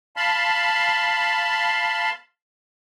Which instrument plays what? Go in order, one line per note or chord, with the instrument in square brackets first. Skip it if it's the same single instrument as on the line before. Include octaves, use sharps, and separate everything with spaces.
[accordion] F5 A5 B5 C6